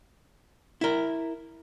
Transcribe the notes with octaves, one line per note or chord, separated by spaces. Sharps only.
E4 A#4